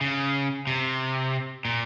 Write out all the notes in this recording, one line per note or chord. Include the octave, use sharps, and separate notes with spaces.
C#3
C3
A#2